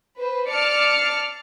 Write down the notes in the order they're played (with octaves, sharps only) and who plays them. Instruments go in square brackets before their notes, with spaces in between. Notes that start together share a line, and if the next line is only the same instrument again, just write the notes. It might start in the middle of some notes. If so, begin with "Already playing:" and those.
[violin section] B4 C5
D5 A5 D6 F6 C7 C#7